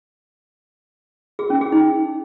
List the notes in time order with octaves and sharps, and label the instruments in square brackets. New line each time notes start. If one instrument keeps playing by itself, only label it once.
[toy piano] G#4
C#4
G#4
D#4